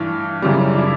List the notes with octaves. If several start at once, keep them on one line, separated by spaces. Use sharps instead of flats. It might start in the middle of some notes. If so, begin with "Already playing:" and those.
Already playing: G2 E3 A3
F#2 C#3 E3 G3
D4
E4